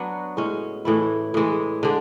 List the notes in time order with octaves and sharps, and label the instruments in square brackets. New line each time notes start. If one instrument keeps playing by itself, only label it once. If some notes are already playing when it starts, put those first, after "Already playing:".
Already playing: [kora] F#3 B3 D4 F#4
A2 G#3 C#4
A2 E3 A3 E4
A2 E3 G#3
D3 G#3 D4